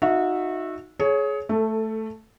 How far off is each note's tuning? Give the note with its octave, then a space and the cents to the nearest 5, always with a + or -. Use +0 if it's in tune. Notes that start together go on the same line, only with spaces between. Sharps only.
D#4 +0 F#4 -25 E5 +0
G#4 +25 C#5 +0
A3 +0 A4 +20